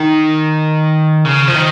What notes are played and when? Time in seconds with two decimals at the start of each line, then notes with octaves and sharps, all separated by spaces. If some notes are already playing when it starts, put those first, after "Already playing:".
Already playing: D#3
1.25 C#3
1.48 F3
1.54 D#3